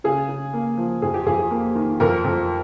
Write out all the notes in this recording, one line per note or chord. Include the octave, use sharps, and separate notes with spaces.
C#3 G#4
C#3
A#3
F3
F2 G#4
G4
F2 G#4
G#4
A#3
D#3
F2 A#4
F2